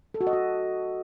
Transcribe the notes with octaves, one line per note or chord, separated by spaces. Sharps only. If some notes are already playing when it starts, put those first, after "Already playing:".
A4
F#4
D#5
F#4